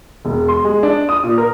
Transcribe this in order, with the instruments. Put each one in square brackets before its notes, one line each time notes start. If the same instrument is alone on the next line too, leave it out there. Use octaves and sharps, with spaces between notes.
[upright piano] E1
C6
G#3
D4
D#6
A#2
A#4